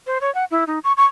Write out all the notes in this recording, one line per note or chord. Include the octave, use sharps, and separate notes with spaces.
C5
C#5
F#5
E4
D#4
C#6
C#6